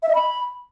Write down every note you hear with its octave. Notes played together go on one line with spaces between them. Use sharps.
E5
D#5
B5